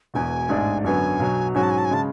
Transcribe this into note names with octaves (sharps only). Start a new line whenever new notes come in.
E1 E2 B2 G#5
A1 G#2 G#3 D4
F#2 D3 F#3 B3 G#5
B1 B2 F#3
G#2 F#3 C#4 F#4 G#5
A5
G#5
A5
G#5
C#3 G#3 A5